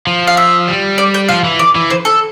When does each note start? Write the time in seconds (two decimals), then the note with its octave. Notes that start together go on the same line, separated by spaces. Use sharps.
0.07 F3
0.27 F5
0.37 E5
0.68 G3
0.98 D5
1.14 G5
1.29 F3 F5
1.44 E3
1.59 D5
1.75 E3
1.90 C5
2.05 A4